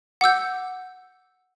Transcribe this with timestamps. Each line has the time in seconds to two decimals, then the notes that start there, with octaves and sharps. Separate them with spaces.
0.21 F#5 D6 E6 G6